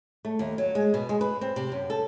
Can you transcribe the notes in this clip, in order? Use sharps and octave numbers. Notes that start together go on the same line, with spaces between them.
A3
D#2
F#3
G#3
B2
G#3
B4
C4
C3
F#2
A4